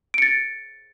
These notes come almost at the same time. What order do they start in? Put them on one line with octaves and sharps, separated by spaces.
D7 C#7 A6